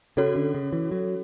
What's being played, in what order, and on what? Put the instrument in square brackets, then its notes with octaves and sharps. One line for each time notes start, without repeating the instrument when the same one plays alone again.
[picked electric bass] C#3 [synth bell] C#4 F#4 A4 C#5
[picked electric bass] D3
C#3
E3
F#3